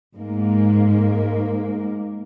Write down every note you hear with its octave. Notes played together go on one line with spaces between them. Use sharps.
G#2 A#3